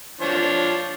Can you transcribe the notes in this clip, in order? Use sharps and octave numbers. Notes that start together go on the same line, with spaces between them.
F3 D4 C#5